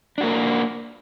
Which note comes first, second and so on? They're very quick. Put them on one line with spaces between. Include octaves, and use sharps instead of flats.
D4 F#4 A#3